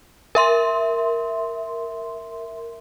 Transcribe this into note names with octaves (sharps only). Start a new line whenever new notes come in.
A#4 E5 C6